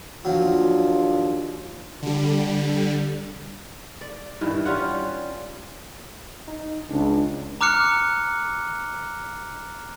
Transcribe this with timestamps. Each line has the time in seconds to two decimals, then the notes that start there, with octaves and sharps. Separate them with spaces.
0.25 D#2 F3 F#3 D4 F4
2.02 D3 G3
4.01 D5
4.41 G2 D#3 E3
4.65 G3 C#4 F4 F#5
6.48 D#4
6.91 C#2 D4
7.61 A#5 D6 F6 F#6 C#7